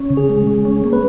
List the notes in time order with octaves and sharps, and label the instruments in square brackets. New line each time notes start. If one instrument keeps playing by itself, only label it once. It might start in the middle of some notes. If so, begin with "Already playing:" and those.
Already playing: [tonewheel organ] C#4
C#3
[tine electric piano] G#4
[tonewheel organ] G#3
G#3
C#4
A#3
[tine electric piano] B4